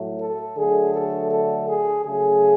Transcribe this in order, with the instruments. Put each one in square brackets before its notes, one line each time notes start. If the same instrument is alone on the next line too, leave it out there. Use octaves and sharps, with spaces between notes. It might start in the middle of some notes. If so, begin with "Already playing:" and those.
Already playing: [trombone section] A2 F#3 A3
A4
D3 F#3 A3 G#4
A4
A4
G#4
C#3 F#3 A3 G#4